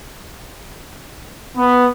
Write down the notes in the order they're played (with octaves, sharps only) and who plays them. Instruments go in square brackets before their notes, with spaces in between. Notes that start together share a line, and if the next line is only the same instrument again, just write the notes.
[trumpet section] B3